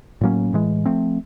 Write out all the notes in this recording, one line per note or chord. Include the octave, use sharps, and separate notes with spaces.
A2 F#3 A#3 C#4
A2 E3 G#3
F3 A3 C4